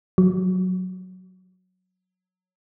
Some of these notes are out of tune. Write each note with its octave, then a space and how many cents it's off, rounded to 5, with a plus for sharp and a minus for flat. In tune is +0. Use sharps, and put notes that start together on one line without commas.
F#3 -5